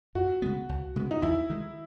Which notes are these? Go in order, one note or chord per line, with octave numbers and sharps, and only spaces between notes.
F#2 F#4
C#3 G#3 B3
C#2
C#3 G#3 B3
D#4
E2 E4
D#3 G#3